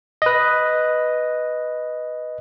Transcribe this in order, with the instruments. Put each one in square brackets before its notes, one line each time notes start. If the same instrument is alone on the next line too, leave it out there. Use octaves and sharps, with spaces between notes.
[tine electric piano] B4 D#5